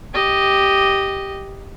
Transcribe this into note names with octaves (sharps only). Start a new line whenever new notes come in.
G4 D#5